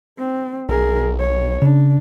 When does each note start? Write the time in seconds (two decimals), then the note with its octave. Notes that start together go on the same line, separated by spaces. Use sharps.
0.18 C4
0.69 B1 G#4 A#4
1.19 C#5
1.62 C#3 D4